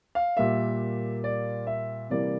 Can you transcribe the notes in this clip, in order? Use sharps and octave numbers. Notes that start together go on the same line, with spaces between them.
F5
A#2 G3 A#3 E5
D5
E5
C3 E3 G3 A#3 D5